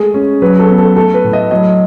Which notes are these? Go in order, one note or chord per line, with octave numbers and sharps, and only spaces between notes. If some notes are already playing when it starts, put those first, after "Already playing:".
Already playing: G#3 A3 G#4
C#4
F#3 B4
A4
B3
A4
A3 A4
B4
A2
D#5
F#3 D#5